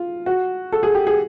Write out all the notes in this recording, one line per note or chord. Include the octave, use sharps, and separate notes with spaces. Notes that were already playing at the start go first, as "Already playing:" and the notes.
Already playing: F4
F#4
A4
G#4
G4
G#4